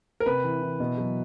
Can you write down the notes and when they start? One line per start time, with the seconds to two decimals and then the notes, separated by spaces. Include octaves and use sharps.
0.20 A#4
0.26 C3 B4
0.44 E3
0.62 E3
0.80 B2
0.97 F#3